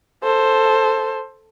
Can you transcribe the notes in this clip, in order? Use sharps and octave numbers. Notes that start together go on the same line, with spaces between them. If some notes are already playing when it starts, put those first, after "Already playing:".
A4 C5